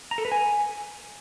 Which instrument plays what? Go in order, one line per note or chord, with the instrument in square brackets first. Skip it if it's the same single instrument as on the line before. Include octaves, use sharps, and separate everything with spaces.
[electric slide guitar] A#5
A4
B4
G#5